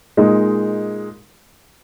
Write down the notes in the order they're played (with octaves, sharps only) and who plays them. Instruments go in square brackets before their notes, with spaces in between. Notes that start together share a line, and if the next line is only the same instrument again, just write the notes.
[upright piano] A#2 G#3 D#4